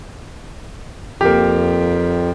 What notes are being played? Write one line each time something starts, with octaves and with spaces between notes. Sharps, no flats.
F2 A#3 G4